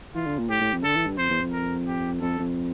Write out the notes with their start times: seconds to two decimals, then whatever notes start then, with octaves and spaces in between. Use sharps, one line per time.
0.15 E3 F4
0.26 D3
0.39 A#2
0.49 A2 G4
0.61 A2
0.73 F2
0.84 D3 A4
0.96 E3
1.07 G2
1.18 F2 C5
1.30 E2
1.42 F2
1.52 A#4
1.87 G4
2.21 F2 A4
2.39 F2